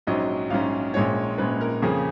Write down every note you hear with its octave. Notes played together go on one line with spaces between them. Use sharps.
A#1 G#2 F#3 C#4 D#5
A#1 G#2 F#3 C#4 F5
A#1 A#2 G#3 C#4 C#5
A#1 A#2 G#3 C#4 B4
A#4
F2 C#3 F3 A#3 C#4 G#4